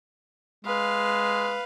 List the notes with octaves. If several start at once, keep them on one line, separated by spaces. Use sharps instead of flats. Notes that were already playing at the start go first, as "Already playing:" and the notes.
G#3 B4 F5